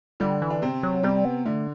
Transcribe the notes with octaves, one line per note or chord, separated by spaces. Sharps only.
D3 G3 D4
E3
D4
C3 C4
F#3
C3 G3 C4
B3
D3 A3 D4